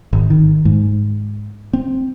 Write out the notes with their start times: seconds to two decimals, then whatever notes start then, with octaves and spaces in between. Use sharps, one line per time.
0.13 G#1
0.30 D#3
0.65 G#2
1.73 C4